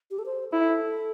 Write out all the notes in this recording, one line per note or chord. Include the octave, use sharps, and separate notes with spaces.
G4
A4
C5
E4 A4